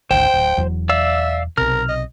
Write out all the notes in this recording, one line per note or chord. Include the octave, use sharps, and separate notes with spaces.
G#1 D2 C5 G5
D1
E1 E2 F#3
D5 E5 F5 E6
B1 C3 A#4 F6
D#5